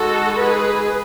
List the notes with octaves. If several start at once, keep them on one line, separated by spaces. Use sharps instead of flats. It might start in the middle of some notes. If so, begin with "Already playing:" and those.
Already playing: G#3 D#4 F#4 A4
G#4 B4